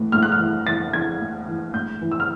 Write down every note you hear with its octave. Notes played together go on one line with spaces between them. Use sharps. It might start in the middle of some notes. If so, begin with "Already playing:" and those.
Already playing: A2 E3
A2 F6
F#6
F6
E3
E3 A6
E3 G#6
A2
E3
A2 G6
E3
E6
F6